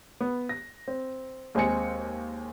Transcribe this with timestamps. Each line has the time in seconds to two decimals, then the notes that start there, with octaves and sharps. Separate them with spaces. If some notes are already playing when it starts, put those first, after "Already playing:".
0.21 B3
0.49 A#6
0.88 C4
1.55 D#2 G#3 C4 G#5 C#7